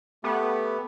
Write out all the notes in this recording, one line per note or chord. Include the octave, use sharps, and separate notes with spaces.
A3 B3 G4